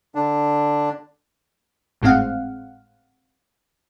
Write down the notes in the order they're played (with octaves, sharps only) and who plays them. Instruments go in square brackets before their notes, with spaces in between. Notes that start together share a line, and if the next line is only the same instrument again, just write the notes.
[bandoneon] D3 D4
[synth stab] G#1 A2 G#3 C4 F5 F#5